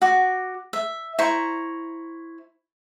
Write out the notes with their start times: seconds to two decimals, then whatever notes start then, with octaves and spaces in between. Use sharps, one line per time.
0.02 F#4 D6
0.73 E5
1.19 E4 C5 A#5 C#6